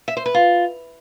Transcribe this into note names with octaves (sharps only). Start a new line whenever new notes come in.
E5
C5
B4
F4